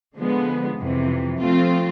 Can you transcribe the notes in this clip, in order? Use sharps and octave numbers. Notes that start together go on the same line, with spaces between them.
D3 F3 G#3 B3
F2 C3 E3
F3 A3 C4 F4